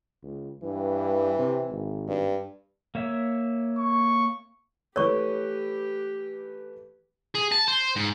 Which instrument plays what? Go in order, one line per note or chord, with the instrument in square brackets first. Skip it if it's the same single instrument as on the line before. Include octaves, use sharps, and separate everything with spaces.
[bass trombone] C#2
[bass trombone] G2 [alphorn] E3
[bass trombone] C3
G#1
[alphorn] G2
[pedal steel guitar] A#3 C#5 E5
[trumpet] C#6
[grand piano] E3 A3 B4 [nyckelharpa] G4 [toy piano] C#5 D5 C#6
[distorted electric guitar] G#4
A5
C5
G#2